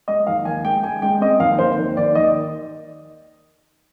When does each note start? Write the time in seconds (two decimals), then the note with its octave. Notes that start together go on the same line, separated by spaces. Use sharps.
0.08 G#3 D#5
0.27 D#2 F5
0.45 D#3 G#5
0.64 G#3 G5
0.84 G#3 G#5
1.02 G#3 G5
1.21 C4 D#5
1.40 D#2 F5
1.59 D#2 C5
1.78 D#3
1.97 D#2 D5
2.15 D#3 D#5